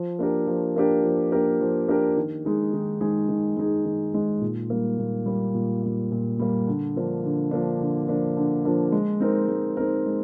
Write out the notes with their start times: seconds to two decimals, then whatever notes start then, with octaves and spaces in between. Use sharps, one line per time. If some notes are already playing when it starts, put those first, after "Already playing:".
Already playing: F3
0.19 A#3 D4 G4 A#4
0.47 F3
0.76 A#3 D4 G4 A#4
1.03 F3
1.32 A#3 D4 G4 A#4
1.60 F3
1.88 A#3 D4 G4 A#4
2.17 D#3
2.45 G#3 D#4 G#4
2.74 D#3
3.01 G#3 D#4 G#4
3.29 D#3
3.57 G#3 D#4 G#4
3.85 D#3
4.14 G#3 D#4 G#4
4.41 A#2
4.70 G3 A#3
4.99 A#2
5.26 G3 A#3
5.55 A#2
5.83 G3 A#3
6.11 A#2
6.39 G3 A#3
6.67 D3
6.96 F3 A#3 D4
7.24 D3
7.51 F3 A#3 D4
7.81 D3
8.08 F3 A#3 D4
8.37 D3
8.65 F3 A#3 D4
8.92 G#3
9.20 C4 D#4 A#4
9.48 G#3
9.77 C4 D#4 A#4
10.06 G#3